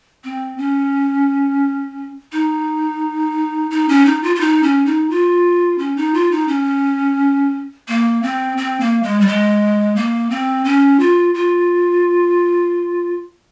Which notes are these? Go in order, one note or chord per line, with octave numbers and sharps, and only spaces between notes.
C4
C#4
D#4
D#4
C#4
D#4
F4
F4
D#4
C#4
D#4
F4
C#4
D#4
F4
D#4
C#4
A#3
C4
C4
A#3
G#3
G3
G#3
A#3
C4
C#4
F4
F4